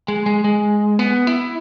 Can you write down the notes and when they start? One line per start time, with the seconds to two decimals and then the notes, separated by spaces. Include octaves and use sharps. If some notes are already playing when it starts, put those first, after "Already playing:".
0.08 G#3
0.26 G#3
0.44 G#3
0.99 B3
1.27 E4